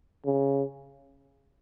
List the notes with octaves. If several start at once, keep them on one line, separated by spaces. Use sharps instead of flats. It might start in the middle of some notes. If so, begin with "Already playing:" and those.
C#3